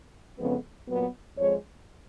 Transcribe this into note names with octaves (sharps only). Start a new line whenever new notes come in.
F2 C#3 F3 G#3 B3
A#2 F#3 B3
F2 F3 G#3 C#5